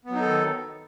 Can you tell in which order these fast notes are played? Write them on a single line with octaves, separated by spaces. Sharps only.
B3 F#3 D#4 A4 D#3